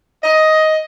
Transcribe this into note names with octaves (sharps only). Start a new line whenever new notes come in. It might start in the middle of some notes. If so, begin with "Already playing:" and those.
D#5